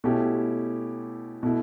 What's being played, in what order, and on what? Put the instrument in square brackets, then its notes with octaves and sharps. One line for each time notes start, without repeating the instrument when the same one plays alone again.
[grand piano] B2 A3 C#4 E4 G4
B2 A3 E4